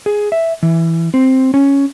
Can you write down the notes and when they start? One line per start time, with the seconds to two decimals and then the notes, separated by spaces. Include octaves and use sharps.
0.06 G#4
0.32 E5
0.63 E3
1.14 C4
1.54 C#4